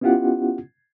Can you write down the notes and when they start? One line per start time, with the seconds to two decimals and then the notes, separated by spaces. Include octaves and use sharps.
0.01 B3 C#4 E4 F4 G4 F#5